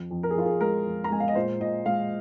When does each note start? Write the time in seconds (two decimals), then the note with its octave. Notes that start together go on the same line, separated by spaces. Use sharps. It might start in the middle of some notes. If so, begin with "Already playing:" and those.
Already playing: F2
0.11 F2
0.23 A#4
0.30 G#4
0.35 F2 F4
0.46 G#4
0.61 G#3 A#4
0.86 F2
1.04 A#5
1.11 G#3 G#5
1.20 F5
1.28 D#5
1.35 A#2 C5
1.61 A#2 D#5
1.86 G#3 F5